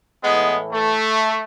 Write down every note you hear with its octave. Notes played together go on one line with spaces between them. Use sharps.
A2 E3 G#3 B3
A3